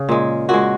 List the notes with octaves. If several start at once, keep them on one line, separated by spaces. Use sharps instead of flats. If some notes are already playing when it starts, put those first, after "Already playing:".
Already playing: C#3
A#2 G#3
A#2 G#3 F#4